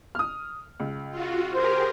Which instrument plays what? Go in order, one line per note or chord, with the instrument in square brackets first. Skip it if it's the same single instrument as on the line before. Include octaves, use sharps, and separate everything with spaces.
[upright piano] D#6 F6
C#2
[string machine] F4 F#4
[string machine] G4 G#4 A#4 [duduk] C5